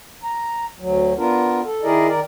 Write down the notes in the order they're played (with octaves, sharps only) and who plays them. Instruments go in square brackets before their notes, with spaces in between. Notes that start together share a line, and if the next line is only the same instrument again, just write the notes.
[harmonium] A#5
D2 F#3
B3 D4 F4 A#4
A4
D#3 E4 G#4 A#4 D5 D#5
D#3 A#4 D5